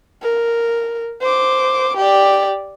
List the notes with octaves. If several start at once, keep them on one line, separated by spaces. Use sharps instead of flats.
A#4
C5 D6
G4 D5